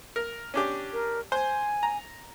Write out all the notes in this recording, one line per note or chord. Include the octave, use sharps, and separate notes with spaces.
A#4
C#4 D4 G4
A#4
C5 G#5
A#5